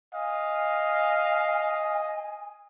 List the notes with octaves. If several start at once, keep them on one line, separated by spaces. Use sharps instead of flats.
D#5 F5 G#5